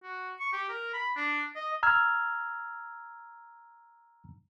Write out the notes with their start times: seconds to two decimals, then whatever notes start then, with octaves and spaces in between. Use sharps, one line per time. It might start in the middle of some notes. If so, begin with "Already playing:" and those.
0.03 F#4
0.40 C#6
0.53 G4
0.69 A#4
0.93 B5
1.16 D4
1.55 D#5
1.83 A#5 E6 F6 G#6